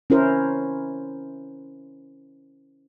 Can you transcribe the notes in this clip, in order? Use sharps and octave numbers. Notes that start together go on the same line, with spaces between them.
C#4 E4 A#4 C5